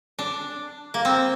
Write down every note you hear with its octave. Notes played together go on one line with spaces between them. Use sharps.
D4
A#3
C4